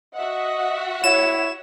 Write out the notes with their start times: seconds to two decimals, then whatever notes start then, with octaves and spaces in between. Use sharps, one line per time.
0.15 F#4 D#5 E5 F#5
1.04 E4 C#5 E7